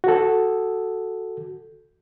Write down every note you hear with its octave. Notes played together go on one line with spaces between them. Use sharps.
F#4 A4